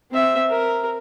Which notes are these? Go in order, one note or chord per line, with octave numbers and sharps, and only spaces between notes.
C4 E5
A#4